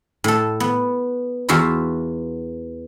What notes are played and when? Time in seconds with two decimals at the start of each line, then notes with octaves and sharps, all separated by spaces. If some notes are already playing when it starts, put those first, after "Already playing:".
0.24 A2 A4
0.60 B3
1.49 E2 F4 F#4 E5 C6